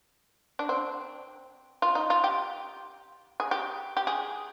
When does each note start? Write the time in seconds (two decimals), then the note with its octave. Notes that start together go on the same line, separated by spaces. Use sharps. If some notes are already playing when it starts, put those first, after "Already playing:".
0.59 D4
0.69 C4
1.82 F4
1.95 D#4
2.10 F4
2.24 G4
3.40 G#4
3.51 G4
3.97 G4
4.07 G#4